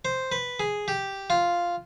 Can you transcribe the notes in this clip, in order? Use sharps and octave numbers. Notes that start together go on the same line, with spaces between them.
C5
B4
G#4
G4
F4